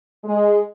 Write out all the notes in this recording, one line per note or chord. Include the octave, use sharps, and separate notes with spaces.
G#3